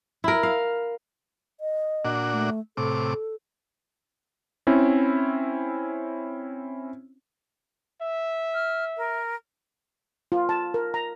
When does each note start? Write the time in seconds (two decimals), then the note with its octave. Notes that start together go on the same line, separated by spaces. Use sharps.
0.24 E4 A#4
0.43 F5
1.60 D#5
2.05 A#2 D4 F#4
2.33 A3
2.77 A2 C3 A4 D6
4.67 C4 C#4 E4
8.01 E5
8.54 F6
8.97 A#4
10.32 F4
10.49 A5
10.74 A#4
10.94 A#5